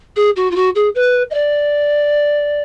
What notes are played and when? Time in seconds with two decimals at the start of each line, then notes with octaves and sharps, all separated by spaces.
0.16 G#4
0.36 F#4
0.51 F4
0.55 F#4
0.75 G#4
0.95 B4
1.30 D#5
1.34 D5